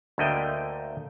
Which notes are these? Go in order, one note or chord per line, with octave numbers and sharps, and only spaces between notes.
D2 D3 A3 A#3 D#5 G5